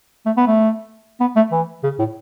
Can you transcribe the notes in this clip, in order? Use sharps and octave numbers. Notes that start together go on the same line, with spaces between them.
A3
B3
A3
B3
A3
E3
C#3
A2